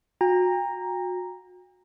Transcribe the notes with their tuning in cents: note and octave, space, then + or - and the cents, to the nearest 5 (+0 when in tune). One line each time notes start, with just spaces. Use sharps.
F#4 -30 G5 +40 A#5 +0